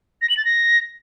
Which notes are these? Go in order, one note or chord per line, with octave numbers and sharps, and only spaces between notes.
A#6
F#7
A6
A#6